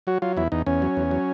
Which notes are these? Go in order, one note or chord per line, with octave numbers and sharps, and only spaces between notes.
F#3 F#4
F#3 F4
E2 E4
E2 D#4
E2 C#4
F#3
E2
F#3